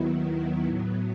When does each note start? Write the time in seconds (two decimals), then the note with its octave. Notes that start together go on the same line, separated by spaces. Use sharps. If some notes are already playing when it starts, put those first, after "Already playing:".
Already playing: D#2 D#3 F#3 B3 E4
0.64 A2 F#3 B3